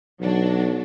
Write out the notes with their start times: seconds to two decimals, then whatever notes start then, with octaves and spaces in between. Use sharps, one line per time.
0.20 B1 F#3 D4 F#4